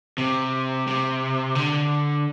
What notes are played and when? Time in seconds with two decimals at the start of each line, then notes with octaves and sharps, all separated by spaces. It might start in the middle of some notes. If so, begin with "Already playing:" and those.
0.18 C3
0.87 C3
1.55 D3